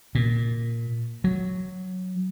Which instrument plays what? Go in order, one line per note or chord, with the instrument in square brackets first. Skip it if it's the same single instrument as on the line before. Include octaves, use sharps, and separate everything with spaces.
[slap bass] A#2
F#3